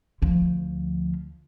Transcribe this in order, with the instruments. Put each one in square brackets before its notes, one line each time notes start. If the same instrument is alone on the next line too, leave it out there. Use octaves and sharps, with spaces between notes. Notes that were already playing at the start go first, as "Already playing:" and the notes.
[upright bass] D2 F3